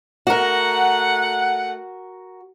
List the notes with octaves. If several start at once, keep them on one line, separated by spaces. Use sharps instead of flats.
A3 F#4 A#4 F#5